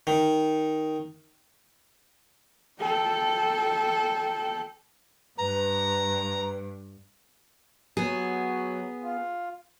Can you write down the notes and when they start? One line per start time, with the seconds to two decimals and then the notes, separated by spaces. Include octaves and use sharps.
0.07 D#3
2.80 A4 G5
5.38 G2 B4 A#5
7.97 F#3 B3 G#4
9.02 F4